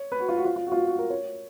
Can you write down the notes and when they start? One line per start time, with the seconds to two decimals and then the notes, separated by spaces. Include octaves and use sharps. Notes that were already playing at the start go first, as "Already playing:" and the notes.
Already playing: C#5
0.12 B4
0.20 F#4
0.29 F4
0.37 F#4
0.45 F4
0.56 F4
0.67 F#4
0.72 F4
0.77 F#4
0.87 F#4
0.99 A#4
1.10 C#5